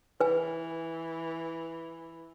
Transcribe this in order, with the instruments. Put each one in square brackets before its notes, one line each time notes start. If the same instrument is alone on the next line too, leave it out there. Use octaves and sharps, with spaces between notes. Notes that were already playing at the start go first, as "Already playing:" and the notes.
[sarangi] E3 [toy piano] B4 G#5